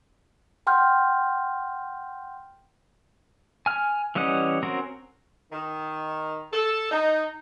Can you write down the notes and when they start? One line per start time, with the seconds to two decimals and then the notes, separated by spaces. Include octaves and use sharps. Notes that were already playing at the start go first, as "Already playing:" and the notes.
0.67 F#5 G5 C6 F6 G6
3.66 G#5 F6
4.15 E3 G3 C#4 D#5 F#5
4.63 C4 C#4 F#4 A#4
5.52 D#3
6.52 A4
6.92 D#4